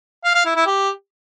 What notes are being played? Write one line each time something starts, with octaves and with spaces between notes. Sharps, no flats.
F5
F5
E4
E4
G4